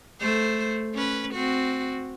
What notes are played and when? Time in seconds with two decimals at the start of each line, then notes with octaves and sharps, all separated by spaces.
0.20 A3 C5
0.94 C#4 B4
1.34 C4 F#4